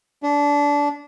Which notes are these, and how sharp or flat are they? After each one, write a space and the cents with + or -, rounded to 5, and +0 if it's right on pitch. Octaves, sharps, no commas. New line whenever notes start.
D4 -20